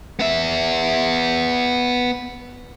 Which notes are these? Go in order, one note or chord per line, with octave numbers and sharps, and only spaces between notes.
B3 E5